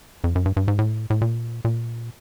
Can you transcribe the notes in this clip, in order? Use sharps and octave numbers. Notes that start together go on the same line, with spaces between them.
F2
F#2
G2
G2
G#2
A2
A2
A#2
A#2